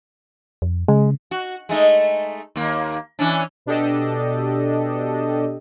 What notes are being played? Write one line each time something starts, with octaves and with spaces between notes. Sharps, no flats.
F2
C#3 G#3
F#4
G#3 A3 D#4
D#2 A#3
E3 C#4 D4
B2 D4 G4 A4 D#5